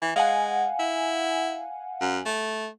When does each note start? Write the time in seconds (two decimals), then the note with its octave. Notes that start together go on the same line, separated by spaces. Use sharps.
0.02 E3
0.16 G#3 F5 F#5 G#5
0.79 E4
2.01 F#2
2.26 A3